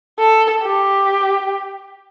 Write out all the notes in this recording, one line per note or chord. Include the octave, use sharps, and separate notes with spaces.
A4
G4